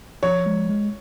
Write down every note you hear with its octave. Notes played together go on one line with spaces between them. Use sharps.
F3 C#5
G#3
G#3